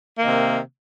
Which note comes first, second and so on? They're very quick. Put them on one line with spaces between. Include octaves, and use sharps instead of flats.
A#3 D#3 C3